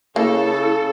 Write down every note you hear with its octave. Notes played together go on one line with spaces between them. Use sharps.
C#3 A#3 E4 A4